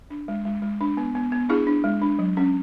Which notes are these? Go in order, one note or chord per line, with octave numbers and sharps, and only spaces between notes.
D4
G#3
G#3
G#3
D4
B3
B3
B3
D4 E4 G#4
D4
G#3
D4
F#3
C#4